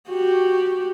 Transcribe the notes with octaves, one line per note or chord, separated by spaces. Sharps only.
F#4 G4